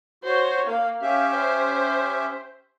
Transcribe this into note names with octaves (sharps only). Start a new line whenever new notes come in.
F#4 C5 C#5
A#3 F5
C#4 G4 E5 F5
C5